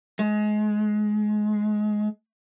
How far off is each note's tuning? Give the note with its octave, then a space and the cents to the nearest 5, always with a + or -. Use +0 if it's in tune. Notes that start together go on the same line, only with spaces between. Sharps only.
G#3 +25